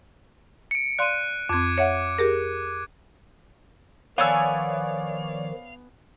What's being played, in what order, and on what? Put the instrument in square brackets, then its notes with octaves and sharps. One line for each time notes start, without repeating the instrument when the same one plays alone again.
[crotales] C#7 D7
[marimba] D5 F5 C6 [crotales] F#6 D#7
[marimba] F2 C4 [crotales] D6 G#6
[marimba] C#5 E5 F#5
G4 G#4 A#4
[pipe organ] D#3 F3 [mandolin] B3 G#5 E6 [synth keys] C#5 D5 [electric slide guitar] F5